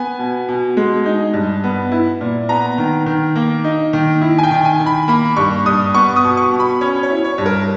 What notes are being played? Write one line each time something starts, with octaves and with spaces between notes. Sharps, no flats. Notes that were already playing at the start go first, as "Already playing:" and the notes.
Already playing: B3 G#5
B2
B2
G#3
D#4
G2
B3
E4
A#2
B3 A#5
D#3
D#3
A#3
D#4
D#3
E4
G#5
G5
D#3
G#5
D#3
B5
A#3 B5
G2 C#6
G2 D#6
B3 C#6
D#6
B2
C#6
B2
B5
C#4 C#5
C#5
E4
C#5
G2
A#4